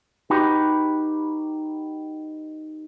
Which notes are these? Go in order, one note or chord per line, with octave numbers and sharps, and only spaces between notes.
D#4 F#4 G4 B4